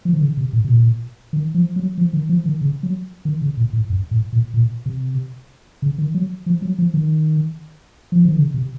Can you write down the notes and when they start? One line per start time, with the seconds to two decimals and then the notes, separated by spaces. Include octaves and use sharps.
0.05 F3
0.13 D#3
0.21 C#3
0.37 C3
0.53 A2
0.64 C3
0.69 A#2
1.33 D#3
1.54 F3
1.76 F#3
1.98 F3
2.13 D#3
2.29 F3
2.46 D#3
2.61 C#3
2.83 F#3
3.25 D#3
3.42 C#3
3.57 A#2
3.73 A2
3.90 F#2
4.11 A2
4.33 A#2
4.54 A#2
4.86 C3
5.82 C#3
5.98 D#3
6.14 F#3
6.46 F3
6.62 F#3
6.79 F3
6.94 D#3
8.12 F3
8.25 D#3
8.39 C#3
8.54 C3